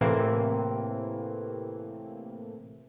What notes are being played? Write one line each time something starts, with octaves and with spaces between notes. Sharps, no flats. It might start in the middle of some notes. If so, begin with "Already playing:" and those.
A2 C3 E3 A#3 C4